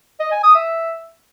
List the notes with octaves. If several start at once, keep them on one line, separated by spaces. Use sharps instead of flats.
D#5
G#5
D#6
E5